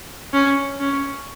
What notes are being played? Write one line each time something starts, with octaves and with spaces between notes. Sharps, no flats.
C#4
C#4